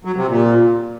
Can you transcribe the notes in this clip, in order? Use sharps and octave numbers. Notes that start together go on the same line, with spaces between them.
F#3
C3
A#2